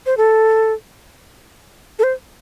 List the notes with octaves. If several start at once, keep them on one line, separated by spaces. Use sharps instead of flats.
C5
A4
A4
C5